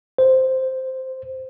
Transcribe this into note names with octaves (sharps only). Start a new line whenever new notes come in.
C5